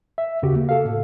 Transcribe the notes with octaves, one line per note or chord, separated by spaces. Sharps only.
E5
D#2 C#3 F#4 G4
A#3
A4 F5
A2